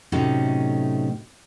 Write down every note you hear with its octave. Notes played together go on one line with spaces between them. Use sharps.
A2 C3 F#3 A3 C#4 D#4